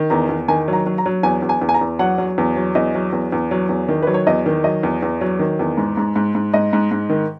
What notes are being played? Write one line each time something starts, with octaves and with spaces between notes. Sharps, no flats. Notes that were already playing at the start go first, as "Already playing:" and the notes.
Already playing: D#3
E2 A#5
E2
D#3 G#5
F#3
A#5
F#3
A#5
F#3
E2 G#5
E2
G#5
E2
G#5
A#5
E2
F#3 F#5
F#3
E2
F#3
E2 D#5
F#3
E2
E2
F#3
E2
D#3
F#3 B4
C#5
E2 D#5
D#3
F#3 D#5
E2
E2
F#3
D#3
E2
G#2
G#2
G#2
G#2
G#2 D#5
G#2
G#2
D#3